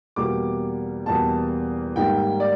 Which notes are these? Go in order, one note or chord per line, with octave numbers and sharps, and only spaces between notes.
E2 B2 G3 A#3 D6
E2 B2 G3 A#3 A5
G#2 D#3 G3 A#3 G5
D5